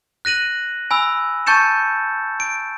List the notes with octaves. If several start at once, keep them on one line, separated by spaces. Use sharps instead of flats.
F#6 A#6 D#7 F#7
G#5 B5 E6
A5 C#6 G6 A6 C#7 E7
D7